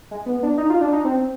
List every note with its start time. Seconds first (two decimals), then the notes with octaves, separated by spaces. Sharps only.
0.11 G#3
0.26 B3
0.43 D4
0.57 D#4
0.70 F4
0.81 D4
0.92 D#4
1.05 C4